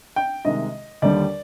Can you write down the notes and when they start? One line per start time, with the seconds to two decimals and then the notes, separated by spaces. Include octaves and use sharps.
0.16 G5
0.45 C2 C3 D#3 G#3 D#5
1.02 D#2 D3 G3 D5